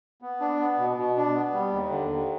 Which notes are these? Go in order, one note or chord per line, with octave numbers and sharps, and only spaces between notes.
B3
D4
B3
B2
B2
D4
B3
G3
D#2
D3
D#2